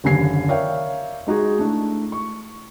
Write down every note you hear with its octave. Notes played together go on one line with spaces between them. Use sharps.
F#1 D#2 D3 G#5 G#6 C7
A#4 C#5 D5 E5 F5 G5
G#3 D#4 F#4 G#4
A3 D4 E4
C#6